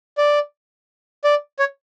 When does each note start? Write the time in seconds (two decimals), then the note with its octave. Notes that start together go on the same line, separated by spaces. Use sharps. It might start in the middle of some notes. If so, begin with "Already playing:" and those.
0.18 D5
1.24 D5
1.59 C#5